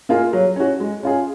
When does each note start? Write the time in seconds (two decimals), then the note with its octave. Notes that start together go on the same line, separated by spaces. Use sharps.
0.09 A#3 F4 G#4
0.33 F#3
0.56 C#4 F#4
0.80 G#3
1.03 C#4 F4 G#4